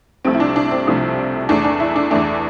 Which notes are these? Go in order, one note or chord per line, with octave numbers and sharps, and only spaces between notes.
C2 C3 F3 A3 C4
E4
D4
D4
C4
C2 C3 F3 A3 D4
E2 E3 A3 D4
D4
E4
D4
E2 E3 A3 D4